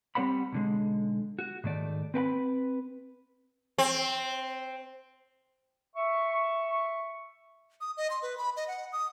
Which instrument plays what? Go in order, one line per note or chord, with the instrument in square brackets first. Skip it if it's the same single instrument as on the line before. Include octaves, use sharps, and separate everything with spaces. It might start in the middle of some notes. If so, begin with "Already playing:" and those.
[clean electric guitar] G3 C4 C5 F#5 B5
B1 D3 G#3
F#4
G#2 D#3 A3 D5
C4 B4 G5 B5
[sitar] C4
[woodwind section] E5 C#6
[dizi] D#6
D#5
C6
B4
B5
D#5
F#5
D#6